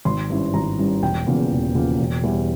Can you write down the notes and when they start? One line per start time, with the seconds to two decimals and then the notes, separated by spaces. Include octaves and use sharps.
0.05 G#1 C6
0.30 G2 G3 C#4 E4
0.54 G#1 A#5
0.78 G2 G3 C#4 E4
1.02 E1 G5
1.26 E2 C#3 F3 A#3
1.51 E1
1.75 E2 C#3 F3 A#3
1.99 E1
2.23 E2 E3 G3